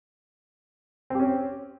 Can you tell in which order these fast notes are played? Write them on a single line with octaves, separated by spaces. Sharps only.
C4 G4 C#4